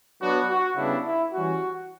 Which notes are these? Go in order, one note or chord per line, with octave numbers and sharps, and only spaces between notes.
F#3 B3 D4 F#4
F#4
C#3 G3 B3 D4 E4
E4
E3 G3 C#4 F#4